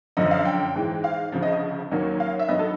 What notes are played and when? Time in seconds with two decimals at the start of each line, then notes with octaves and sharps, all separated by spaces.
0.17 F#2 D3 F3 D#5
0.31 F5
0.45 G5
0.75 G#2 E3 G#3
1.04 F5
1.32 D2 C#3 F3
1.42 D#5
1.91 D#2 D#3 F#3 A#3 C#4
2.20 F5
2.39 E5
2.48 G2 D#3 F#3 B3 D#5
2.59 A4